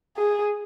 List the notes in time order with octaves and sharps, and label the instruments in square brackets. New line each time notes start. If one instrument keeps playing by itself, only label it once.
[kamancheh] G#4